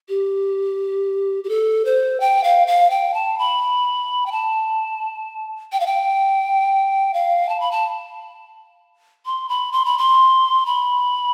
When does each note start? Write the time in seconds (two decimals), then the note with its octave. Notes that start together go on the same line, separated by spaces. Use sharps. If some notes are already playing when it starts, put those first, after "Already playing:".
0.09 G4
1.44 G4
1.49 A4
1.85 C5
2.20 G5
2.44 F5
2.67 F5
2.90 G5
3.14 A5
3.38 B5
4.26 G5
4.32 A5
5.72 G5
5.80 F5
5.87 G5
7.14 F5
7.49 A5
7.60 B5
7.71 A5
9.26 C6
9.49 B5
9.72 C6
9.85 B5
9.98 C6
10.66 B5